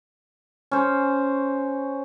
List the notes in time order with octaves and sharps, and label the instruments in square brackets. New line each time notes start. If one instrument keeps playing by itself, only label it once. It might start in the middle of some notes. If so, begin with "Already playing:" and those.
[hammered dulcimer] C#4 C5